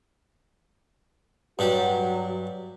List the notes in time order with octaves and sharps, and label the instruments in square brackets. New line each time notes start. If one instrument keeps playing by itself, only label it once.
[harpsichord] G2 D4 G4 [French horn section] F#3 F#4